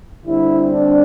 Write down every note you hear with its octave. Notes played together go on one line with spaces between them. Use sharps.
D3 G3 C4 E4
D4